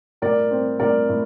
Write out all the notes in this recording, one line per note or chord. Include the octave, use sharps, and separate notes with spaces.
A2 A#4 D5
C4
A2 A#4 D5
A2